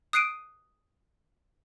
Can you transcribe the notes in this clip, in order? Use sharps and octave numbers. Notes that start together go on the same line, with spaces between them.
D#6 F#6 C7 D7 D#7